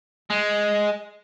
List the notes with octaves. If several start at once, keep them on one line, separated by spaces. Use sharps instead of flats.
G#3